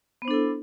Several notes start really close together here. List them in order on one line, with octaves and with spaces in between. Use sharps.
B3 C5 D4 A4 E4